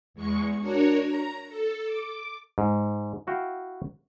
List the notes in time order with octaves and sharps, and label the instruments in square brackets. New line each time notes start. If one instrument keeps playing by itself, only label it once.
[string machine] E2 G#3 C#6 C#7
D4 F#4 A#4 C#5
A#5 A#6
A4
D6
[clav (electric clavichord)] G#2
E4 F#4 F5 G5